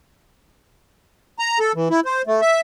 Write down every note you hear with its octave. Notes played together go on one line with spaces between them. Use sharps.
A#5
A4
E3
E4
C5
A3
E5